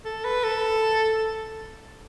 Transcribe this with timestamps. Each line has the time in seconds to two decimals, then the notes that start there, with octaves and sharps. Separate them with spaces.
0.05 A4
0.24 B4
0.44 A4